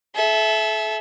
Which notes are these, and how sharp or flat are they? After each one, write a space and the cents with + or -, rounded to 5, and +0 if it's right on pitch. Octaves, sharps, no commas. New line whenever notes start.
A4 -35 E5 +0